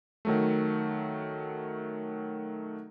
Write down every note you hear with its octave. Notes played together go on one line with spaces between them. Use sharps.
D#3 F#3 A3